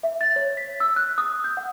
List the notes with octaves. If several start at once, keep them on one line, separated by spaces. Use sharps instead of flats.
E5
A6
C#5
B6
E6
F#6
D#6
G6
F#5